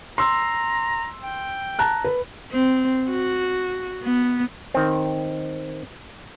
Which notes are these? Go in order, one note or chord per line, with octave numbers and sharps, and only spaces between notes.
A#5 C6 E6
G5
A5 A#5 F#6
B4
C4
F#4
B3
D#3 C4